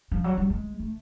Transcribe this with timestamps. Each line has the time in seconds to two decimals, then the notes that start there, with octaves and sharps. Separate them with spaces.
0.12 F3
0.24 F#3
0.37 G3
0.50 G#3
0.79 A3